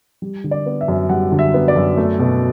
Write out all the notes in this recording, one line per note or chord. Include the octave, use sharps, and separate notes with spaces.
G3
D3
D5
B3
E5
F#2
G3 F#5
D3
E5
B3
D5
F#2
A3
B2